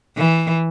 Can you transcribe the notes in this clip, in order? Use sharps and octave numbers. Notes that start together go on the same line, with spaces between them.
E3